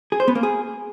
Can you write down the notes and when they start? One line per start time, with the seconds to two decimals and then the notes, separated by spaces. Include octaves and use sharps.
0.12 G#4
0.20 C5
0.28 B3
0.35 A#3
0.43 G#4